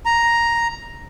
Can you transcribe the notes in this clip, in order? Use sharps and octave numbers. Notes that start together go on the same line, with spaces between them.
A#5